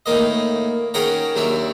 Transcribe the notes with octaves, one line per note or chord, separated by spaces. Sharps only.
A2 D#3 A#3 D#5
D#3 C#4 G#4 F#5 G5 A#5
D#2 F#3 D4 E5